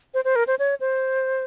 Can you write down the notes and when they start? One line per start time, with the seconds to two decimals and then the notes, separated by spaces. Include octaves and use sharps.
0.14 C5
0.24 C5
0.36 A#4
0.47 C5
0.59 C#5
0.80 C5